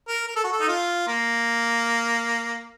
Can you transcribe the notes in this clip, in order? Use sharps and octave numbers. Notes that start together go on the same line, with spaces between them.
A#4
A#4
A4
F#4
A4
D#4
F4
A#3